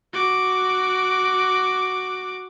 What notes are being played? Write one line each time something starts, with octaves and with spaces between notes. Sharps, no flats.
F#4 D6